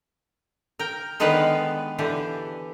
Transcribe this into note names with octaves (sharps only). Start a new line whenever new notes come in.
A#4 G5
D3 D#3 G#3 B3 B4 F5
D3 E3 G4